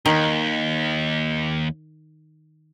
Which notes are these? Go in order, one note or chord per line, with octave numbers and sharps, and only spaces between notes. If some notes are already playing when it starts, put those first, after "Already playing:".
D#2 D#3